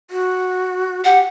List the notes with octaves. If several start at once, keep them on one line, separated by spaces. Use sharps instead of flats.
F#4
G4 F#5